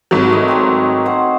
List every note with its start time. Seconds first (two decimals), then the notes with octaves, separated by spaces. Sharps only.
0.11 G#1 F#3
0.30 A3 D#5
0.48 C4 D#4 C#5
1.06 C5 F#5